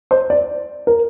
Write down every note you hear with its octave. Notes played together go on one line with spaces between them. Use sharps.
C5
D5
A#4